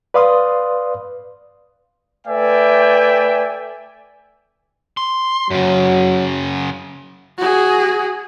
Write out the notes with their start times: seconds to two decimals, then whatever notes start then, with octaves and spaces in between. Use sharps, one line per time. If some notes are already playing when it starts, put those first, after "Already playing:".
0.14 B4 D5 F5 C6 D#6
2.26 A3 B4 D5 E5 G5 G#5
4.97 C6
5.51 F#2 C#3 F#3
7.38 F#4 G#4